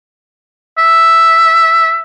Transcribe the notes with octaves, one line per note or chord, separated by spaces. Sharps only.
E5